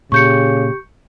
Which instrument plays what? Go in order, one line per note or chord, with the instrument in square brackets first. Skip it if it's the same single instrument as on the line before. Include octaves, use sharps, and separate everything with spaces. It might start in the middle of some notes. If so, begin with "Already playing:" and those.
[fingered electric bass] A#2 [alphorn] C#3 [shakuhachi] G4 [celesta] C#6 G6 C#7